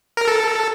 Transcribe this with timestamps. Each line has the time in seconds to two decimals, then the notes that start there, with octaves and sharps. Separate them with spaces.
0.17 A#4
0.28 A4